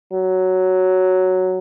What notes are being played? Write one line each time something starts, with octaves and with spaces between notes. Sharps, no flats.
F#3